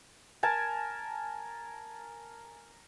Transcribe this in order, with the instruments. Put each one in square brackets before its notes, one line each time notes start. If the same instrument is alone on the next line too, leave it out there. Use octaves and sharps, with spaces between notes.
[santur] A#4 G#5 A5